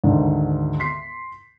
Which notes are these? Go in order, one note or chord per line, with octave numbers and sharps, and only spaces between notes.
D2 G#2 D3 D#3
C6 B6 C7